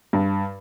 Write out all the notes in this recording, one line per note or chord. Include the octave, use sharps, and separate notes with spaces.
G2